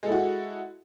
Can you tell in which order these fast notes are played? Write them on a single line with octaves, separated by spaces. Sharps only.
G#3 A4 E4 F#4